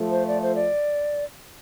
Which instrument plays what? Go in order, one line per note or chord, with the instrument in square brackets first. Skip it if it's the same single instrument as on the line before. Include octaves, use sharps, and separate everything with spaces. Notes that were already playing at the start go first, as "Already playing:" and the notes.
Already playing: [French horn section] F3 A3
[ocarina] C5
D5
C5
D5